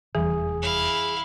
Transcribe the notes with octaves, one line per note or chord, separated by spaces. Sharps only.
F1 E2 E3 G3 G#4
E4 F5